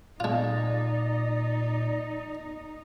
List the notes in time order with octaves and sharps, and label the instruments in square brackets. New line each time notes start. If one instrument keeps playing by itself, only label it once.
[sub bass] A#2 [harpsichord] G#3 F4 [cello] D#4 [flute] D5